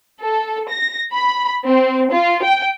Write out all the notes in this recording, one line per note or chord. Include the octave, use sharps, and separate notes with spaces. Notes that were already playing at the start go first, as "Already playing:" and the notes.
A4
A#6
B5
C4
F4
G5